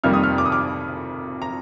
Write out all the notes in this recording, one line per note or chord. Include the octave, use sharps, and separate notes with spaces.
F1 F2 D#3 G3 A#3 F6
D#6
F6
D6
D#6
D6
A#5